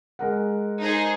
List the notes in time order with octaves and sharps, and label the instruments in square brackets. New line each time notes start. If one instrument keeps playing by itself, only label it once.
[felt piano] G#3 A#4 F#5
[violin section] D#4 G#4 C5